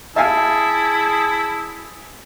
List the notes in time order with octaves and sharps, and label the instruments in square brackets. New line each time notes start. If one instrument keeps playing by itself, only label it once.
[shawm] E4 [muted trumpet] G#4 [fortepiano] E5 F5 G#5 [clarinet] A5